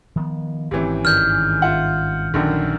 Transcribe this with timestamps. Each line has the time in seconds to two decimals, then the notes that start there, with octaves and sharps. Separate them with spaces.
0.16 D#3 F3 B3
0.71 G#1 C3 E3 C4 C#4
1.05 G2 D#3 G#3 F6 G6
1.62 F4 E5 F#5
2.34 A#1 F#2 D3 D#3 F3 C#4